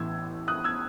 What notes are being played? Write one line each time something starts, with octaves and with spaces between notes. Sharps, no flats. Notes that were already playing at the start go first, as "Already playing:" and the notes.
Already playing: A1 A2 E3 B3 E6 G#6
D#6 F#6
E6 G#6